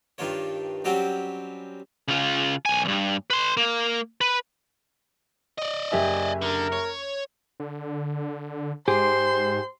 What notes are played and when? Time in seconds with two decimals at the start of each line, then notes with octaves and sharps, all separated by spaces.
0.18 G2 D#3 D4 F4 C#5
0.84 F#3 G3 C4 C#4 F#4 G4
2.08 C#3 F4
2.65 B1 G#5
2.85 E2 G2
3.30 B4 C6
3.57 A#3
4.21 B4
5.58 D5 D#5
5.92 F#1 G4 E5 G#5
6.42 D3 A#4
6.72 C#5
7.60 D3
8.88 G#2 G4 G#4 C5 C6